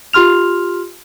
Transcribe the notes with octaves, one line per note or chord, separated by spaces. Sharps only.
F4 G4 C6 F6 F7